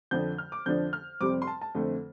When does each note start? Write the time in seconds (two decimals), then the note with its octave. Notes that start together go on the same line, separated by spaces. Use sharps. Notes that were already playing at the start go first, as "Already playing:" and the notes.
0.11 F2 D3 F3 D4 G6
0.38 F6
0.52 D6
0.66 F2 D3 F3 D4 G6
0.93 F6
1.21 F2 C3 G3 C4 D6
1.42 C6
1.47 A5
1.61 A5
1.75 F2 D3 A3 C4